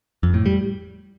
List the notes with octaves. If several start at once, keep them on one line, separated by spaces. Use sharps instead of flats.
F2
A2
G3